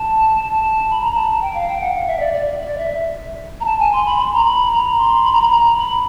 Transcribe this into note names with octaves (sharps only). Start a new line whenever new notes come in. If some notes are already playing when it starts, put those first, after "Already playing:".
Already playing: A5
B5
A#5
A5
G5
F5
G5
F#5
F5
E5
D5
D5
D5
E5
A#5
A5
G#5
C6
B5
C6
A#5
B5
A#5
C6
B5
A#5
B5
A#5
B5